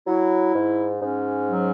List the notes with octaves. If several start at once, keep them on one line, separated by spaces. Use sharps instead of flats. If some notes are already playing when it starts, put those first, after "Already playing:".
F#3 E4
G#2
G#2 C#4
F#3